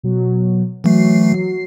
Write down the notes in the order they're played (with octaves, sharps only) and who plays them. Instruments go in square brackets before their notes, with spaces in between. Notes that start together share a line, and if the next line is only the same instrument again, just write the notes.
[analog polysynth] B2 F#3
[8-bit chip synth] E3 A3 [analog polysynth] F#3 C7